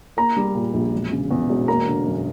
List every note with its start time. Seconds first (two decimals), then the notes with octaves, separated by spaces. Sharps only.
0.17 A#3 A#5
0.37 G3
0.55 A#2
0.74 A#1
0.93 E1
1.12 C#3
1.31 E2
1.49 E1
1.68 A#3 A#5
1.87 D3
2.06 F#2